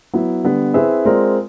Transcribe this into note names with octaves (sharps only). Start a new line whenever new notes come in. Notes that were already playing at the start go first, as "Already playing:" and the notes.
F#3 B3 E4
D3 G3 B3
C4 E4 G#4 B4 E5
G#3 C4 F4 A#4 D5